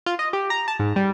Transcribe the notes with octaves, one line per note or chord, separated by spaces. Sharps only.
F4
D#5
G4
A#5
A5
G#2
G3